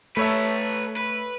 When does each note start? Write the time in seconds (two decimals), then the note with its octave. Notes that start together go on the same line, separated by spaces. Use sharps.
0.17 A3 A4 B4 C#5 E5
0.97 B4